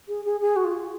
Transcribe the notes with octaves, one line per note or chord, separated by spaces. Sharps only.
G#4
G#4
G#4
F#4
F4